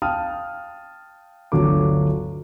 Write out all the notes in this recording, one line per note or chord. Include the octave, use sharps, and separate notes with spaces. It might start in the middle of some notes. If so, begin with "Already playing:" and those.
F5 G5 A5 D#6 F6
G1 D2 F#3 D4 D6